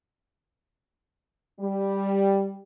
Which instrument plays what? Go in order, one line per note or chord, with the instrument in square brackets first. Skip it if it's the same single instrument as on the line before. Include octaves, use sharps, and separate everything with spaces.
[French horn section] G3